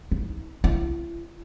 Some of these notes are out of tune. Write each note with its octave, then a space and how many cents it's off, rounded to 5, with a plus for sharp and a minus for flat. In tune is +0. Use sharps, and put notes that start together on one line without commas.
E4 -45
E4 +40